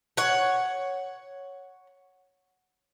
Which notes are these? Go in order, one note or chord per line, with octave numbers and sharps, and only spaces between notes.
C#5 F#5